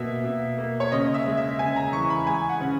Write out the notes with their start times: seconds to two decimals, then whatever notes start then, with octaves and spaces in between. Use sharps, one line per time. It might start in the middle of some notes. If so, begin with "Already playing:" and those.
Already playing: B2 A#3 E5
0.24 B2
0.58 A#3
0.80 C#5
0.92 C#3 D#5
1.14 E5
1.26 G#3
1.37 E5
1.59 C#3 G#5
1.76 A#5
1.93 E3 C#6
2.10 B5
2.27 G#3 G#5
2.49 F#5
2.61 C#3